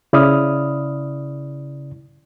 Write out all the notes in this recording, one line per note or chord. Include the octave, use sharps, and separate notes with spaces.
C#3 E4 D5 B5 D#6 F6